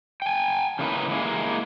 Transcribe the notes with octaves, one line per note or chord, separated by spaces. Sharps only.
G5 G#5
C#3 E3 A#3 D#4 A#4 B4
G#3 A#3 E4